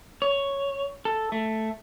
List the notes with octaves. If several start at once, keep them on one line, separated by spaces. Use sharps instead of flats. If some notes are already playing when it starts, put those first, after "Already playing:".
C#5
A4
A3